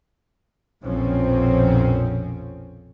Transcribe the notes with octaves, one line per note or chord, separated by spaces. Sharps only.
A#1 F2 B2 F3 C4 C#4